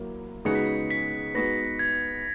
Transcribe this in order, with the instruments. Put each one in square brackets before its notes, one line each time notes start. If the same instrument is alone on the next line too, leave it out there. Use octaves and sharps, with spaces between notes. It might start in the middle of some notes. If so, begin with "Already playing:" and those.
Already playing: [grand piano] F#3 A#3 E4 A#4
[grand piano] C#3 G#3 B3 D#4 F#4 [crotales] C#7
[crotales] B6
C#7
B6
[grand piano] G#3 B3 D#4 F#4 B4 [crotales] A#6
[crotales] G#6